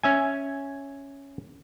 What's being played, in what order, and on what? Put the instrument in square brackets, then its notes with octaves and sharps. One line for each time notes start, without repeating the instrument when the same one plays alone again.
[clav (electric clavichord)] C#4 E5 G#5